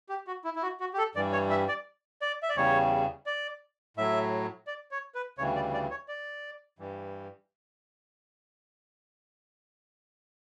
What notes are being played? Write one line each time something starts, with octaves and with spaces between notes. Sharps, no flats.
G4
F#4
E4
E4
F#4
F#4
G4
A4
G2 E3 G3 D5
C#5
E5
D5
D5
E5
D5
E2 C#3 G3 C#5
D5
A2 F#3 E5
D5
C#5
B4
D2 C#3 E3 G3 C#5
D5
D5
C#5
D5
G2 E3 G3